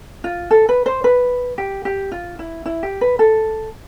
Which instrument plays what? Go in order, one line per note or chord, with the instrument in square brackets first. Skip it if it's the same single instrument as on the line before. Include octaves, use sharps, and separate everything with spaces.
[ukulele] F4
A4
B4
C5
B4
G4
G4
F4
E4
E4
G4
B4
A4